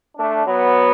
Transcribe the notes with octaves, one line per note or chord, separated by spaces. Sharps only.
A3 D4
F#3 B3